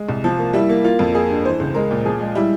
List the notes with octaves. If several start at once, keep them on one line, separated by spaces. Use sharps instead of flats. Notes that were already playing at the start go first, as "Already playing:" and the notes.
Already playing: G#3
C2
F3
A#3
G3 E4
A#3
A#3 F4
F2
A#3 G#4
G2
E3 C5
C#2
G#3 A#4
A#2
F3 G#4
G#3
G3 E4